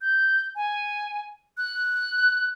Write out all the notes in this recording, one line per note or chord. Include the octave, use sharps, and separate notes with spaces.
G6
G#5
F#6